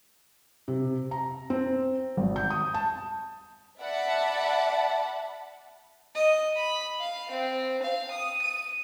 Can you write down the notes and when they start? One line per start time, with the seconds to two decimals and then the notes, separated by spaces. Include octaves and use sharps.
0.68 C3
1.11 A#5
1.50 C4
2.17 G#1
2.36 G6
2.50 D#6
2.74 A5
3.80 D5 E5 F#5 A5 B5
6.15 D#5
6.56 B5
7.01 F5
7.31 C4
7.83 F5
8.11 D#6
8.42 D#7